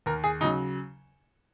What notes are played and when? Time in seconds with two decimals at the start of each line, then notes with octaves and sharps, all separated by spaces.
0.06 D#2 A#4
0.24 G#4
0.41 C#3 F#3 D#4